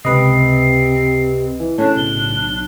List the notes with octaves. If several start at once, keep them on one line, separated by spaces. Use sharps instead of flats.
C#2 C3 C4 B4 D#5 C7
E3
A2 C#3 C#4 D4 A5
B1 G7